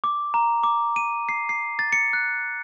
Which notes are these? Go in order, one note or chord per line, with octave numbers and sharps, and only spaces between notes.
D6
A#5
D6
D#7
C7
C7
A6
C#7
F#6